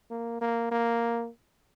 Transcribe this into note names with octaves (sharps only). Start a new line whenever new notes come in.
A#3
A#3
A#3